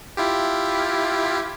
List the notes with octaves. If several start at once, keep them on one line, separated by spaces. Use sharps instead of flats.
E4 F4 G4